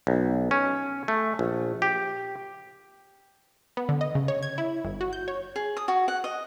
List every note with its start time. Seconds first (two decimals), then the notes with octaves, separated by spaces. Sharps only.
0.07 B1
0.51 C#4
1.08 A3
1.39 A#1
1.82 G4
3.77 B3
3.89 D3
4.01 D#5
4.15 C#3
4.28 C#5
4.43 G#6
4.58 E4
4.85 G1
5.01 F#4
5.13 G6
5.28 C#5
5.56 G#4
5.77 D#6
5.88 F#4
6.08 F#5
6.24 D#5